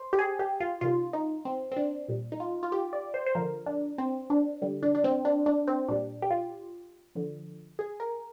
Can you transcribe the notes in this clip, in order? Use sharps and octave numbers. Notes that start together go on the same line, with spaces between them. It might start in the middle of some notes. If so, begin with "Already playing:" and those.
Already playing: C5
G4
G#4
G4
F4
C3 D#3 G3 F4
D#4
C4
C4
D4
A#2 G3
D#4
F4
F4
G4
D5
C5
C5
D3 F3 A#4
D4
C4
D4
D3 G3
D4
D4
C4
D4
D4
C4
A#2 G3 D4
G4
F4
D3 F3
G#4
A#4